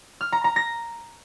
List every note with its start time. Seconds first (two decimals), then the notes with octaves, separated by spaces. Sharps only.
0.21 F6
0.32 A#5
0.44 A#5
0.56 A#6